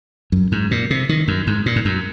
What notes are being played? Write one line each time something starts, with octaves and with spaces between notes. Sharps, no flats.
F#2
G#2
A#2
C3
D#3
F#2
G#2
A#2
G#2
F#2